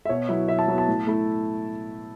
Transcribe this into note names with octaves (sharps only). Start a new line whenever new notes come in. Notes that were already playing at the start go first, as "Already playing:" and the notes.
E5
B2 C#5
F#3 B3 E4 E5
B2 E5
A5
F#3 B3 E4
A5
A2
A3 E4